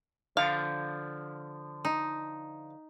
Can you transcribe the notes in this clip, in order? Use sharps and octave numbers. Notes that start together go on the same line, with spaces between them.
D3 F3 F5
D#4